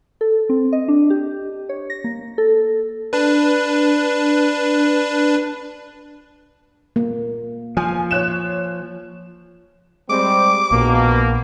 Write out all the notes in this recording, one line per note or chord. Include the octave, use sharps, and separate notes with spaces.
A4
C4
D#5
D4
G4
C#5
A#6
A#3
A4
D4 B4
A#3
F3 G#5
C#5 F#6 E7
G3 G#3 C4 D6
A#1 B2 A#3